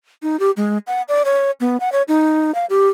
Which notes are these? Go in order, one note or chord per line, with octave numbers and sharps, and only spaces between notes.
D#4
G4
G#3
F#5
D5
C#5
B3
F#5
C#5
D#4
F5
G4